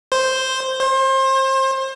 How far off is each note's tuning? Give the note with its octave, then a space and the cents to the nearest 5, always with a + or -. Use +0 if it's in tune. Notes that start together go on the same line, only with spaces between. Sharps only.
C5 +0
C5 +30